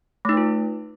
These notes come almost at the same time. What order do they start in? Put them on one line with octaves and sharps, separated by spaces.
A3 D#4 B4 F4